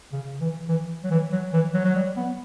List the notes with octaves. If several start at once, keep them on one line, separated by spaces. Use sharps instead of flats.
C#3
E3
E3
F#3
E3
F#3
E3
F#3
F#3
G3
B3